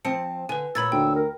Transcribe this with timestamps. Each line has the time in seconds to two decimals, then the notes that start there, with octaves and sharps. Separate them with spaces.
0.05 F3 C4 A5 C#7
0.49 D3 B4 G#5
0.75 A#2 B4 C#5 B5 E6 G#6 A6
0.92 D2 G5
1.15 A#4